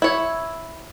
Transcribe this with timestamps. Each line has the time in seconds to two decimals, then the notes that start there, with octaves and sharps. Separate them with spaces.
0.02 E4 C#5